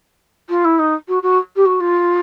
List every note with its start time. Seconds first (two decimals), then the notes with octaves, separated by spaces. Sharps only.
0.49 F4
0.65 E4
0.79 D#4
1.08 F#4
1.22 F#4
1.56 G4
1.65 F#4
1.80 F4